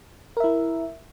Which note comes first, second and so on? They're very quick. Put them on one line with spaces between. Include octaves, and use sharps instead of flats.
A#4 E5 E4